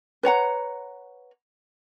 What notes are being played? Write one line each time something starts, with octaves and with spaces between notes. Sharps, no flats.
B4 C#5 F#5 A#5